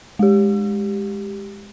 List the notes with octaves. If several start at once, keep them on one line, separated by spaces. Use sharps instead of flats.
G#3 G4